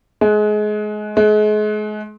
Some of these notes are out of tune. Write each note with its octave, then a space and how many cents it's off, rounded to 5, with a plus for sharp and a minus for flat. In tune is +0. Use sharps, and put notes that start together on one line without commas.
G#3 +25
G#3 +35